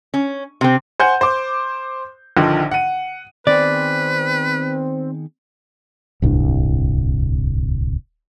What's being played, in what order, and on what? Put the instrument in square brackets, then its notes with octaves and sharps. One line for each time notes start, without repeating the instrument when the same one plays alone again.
[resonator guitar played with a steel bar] C#4
C3 C4
[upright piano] C5 F#5 G#5 G6
C5 D6
A#1 D3 D#3 F3
F#5 D#7
[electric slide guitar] D#3 B3 G#4 [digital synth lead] C4 [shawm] B4 [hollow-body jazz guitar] D5
[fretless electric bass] D1 C2 G2 D4